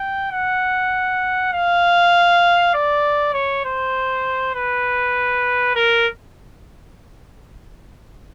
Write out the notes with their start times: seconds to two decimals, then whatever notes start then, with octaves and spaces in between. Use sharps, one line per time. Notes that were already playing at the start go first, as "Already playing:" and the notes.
Already playing: G5
0.32 F#5
1.53 F5
2.74 D5
3.34 C#5
3.65 C5
4.55 B4
5.75 A#4